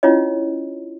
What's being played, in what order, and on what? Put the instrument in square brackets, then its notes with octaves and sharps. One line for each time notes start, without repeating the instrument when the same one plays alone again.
[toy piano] C#4 D4 E4 F4 C#5 D#5